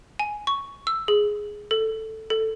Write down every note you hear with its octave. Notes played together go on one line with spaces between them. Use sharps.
G#5
C#6
E6
G#4
A4
A4